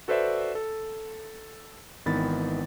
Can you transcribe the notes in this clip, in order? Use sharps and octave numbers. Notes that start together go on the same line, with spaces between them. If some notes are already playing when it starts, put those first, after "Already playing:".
F#4 A4 B4 C5 D5 E5
A4
G#1 D#3 E3 B3 B5 A6